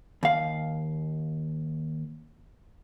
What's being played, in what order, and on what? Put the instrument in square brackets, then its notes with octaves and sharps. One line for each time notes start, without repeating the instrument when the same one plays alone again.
[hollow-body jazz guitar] D#2 F5